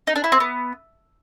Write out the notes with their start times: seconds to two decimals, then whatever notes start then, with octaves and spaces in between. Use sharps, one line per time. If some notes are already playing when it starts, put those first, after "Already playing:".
0.07 D#4
0.16 D4
0.24 E4
0.32 C4
0.40 B3